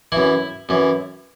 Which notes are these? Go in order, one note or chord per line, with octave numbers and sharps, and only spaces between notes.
F#2 E3 E4
F#2 E3